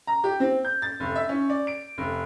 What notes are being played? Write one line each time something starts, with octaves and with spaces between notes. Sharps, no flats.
A#5
G4
C4
G6
A6
F1
E5
C#4
D5
D7
F1